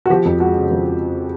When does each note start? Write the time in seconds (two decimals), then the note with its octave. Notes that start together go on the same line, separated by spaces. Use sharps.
0.06 F#4
0.10 F3 G4
0.25 F2
0.40 G#3 F#4
0.56 C#3
0.71 F3